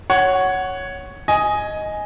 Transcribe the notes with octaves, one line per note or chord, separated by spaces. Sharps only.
C#5 F#5
D#5 G#5